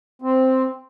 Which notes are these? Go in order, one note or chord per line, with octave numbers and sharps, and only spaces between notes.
C4